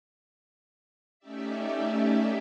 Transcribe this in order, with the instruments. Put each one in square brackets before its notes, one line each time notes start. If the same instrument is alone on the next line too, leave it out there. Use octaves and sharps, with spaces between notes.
[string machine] A3 C#4 D#4 G4 D5 E5